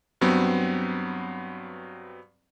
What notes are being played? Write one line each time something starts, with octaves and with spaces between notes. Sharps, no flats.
G2 F#3 B3 C4